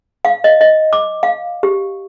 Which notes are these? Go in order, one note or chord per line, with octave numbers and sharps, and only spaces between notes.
F5
D#5
D#5
D6
F5
G4